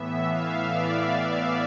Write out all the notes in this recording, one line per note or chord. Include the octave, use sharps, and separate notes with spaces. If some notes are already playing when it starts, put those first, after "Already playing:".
Already playing: A2 E3 B3 E5
F5
D5
F5